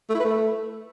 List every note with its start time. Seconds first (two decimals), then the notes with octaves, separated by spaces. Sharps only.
0.09 A3
0.14 E4
0.20 B4
0.25 A3